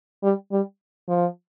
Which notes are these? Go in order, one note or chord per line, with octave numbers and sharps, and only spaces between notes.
G3
G3
F3